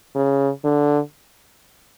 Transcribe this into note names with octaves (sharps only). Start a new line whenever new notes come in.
C#3
D3